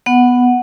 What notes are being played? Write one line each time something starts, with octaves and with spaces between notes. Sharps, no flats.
B3 F#5